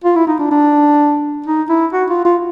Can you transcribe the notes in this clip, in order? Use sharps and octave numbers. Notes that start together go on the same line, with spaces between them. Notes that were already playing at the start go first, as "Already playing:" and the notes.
F4
E4
D#4
D4
D4
D#4
E4
F#4
F4
F4